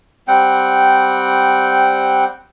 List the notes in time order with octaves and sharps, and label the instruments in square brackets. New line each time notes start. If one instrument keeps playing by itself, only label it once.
[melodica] G3 C4 F#5 G5